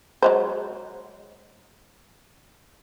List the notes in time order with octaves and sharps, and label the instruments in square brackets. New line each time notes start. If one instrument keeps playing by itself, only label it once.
[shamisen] F#3 G#3 C5